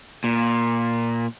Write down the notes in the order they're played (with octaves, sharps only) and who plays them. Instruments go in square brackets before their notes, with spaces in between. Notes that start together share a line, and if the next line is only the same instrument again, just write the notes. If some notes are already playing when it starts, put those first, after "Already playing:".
[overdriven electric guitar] A#2